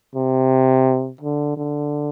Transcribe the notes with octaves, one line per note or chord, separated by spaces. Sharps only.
C3
D3
D3